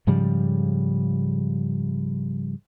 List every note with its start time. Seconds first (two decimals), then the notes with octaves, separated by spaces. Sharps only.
0.07 G#2 C#3 F3 G3